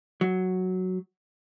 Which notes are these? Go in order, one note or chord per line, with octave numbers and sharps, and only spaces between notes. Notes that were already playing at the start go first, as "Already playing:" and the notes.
F#3